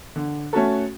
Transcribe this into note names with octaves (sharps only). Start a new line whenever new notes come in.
D3
A3 C#4 F#4 A4